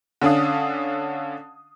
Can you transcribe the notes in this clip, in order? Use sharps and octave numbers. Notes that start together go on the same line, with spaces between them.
D3 C#4 D4 F5 D#6